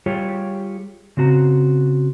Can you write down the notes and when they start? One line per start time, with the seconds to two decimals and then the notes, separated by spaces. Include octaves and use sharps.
0.06 G3 F4 G4 G#4 C#5
1.17 C#3 C4 F#4 A#5